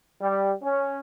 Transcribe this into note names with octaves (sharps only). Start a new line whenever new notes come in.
G3
C#4